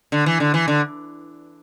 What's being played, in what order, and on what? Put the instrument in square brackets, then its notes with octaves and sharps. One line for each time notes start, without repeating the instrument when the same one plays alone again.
[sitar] D3
E3
D3
E3
D3